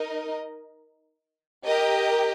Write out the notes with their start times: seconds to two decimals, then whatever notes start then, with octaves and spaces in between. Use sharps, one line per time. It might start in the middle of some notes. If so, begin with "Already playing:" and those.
Already playing: D#4 A#4 D#5
1.64 G4 A#4 D#5 G5